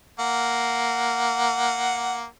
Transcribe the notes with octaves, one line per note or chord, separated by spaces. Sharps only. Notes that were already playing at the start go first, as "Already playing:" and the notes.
A#3 F#5